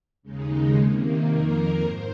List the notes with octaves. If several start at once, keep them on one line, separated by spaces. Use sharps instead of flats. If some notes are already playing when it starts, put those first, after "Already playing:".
D#2 C#3 G#3 D#4
C3 D#3 A#3
F2 D#3 A#3 A#4
G#2 C5